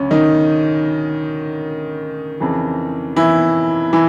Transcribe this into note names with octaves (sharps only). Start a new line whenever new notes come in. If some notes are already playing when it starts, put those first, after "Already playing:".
Already playing: D2 C#3 F#3 C#4
D#3 D#4
F2 C#3 E3
E3 E4
E3 E4